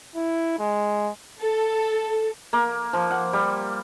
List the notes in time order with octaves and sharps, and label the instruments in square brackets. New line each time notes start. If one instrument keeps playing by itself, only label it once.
[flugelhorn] E4
G#3
[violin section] A4
[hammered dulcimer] A#3
F3
F#5
G3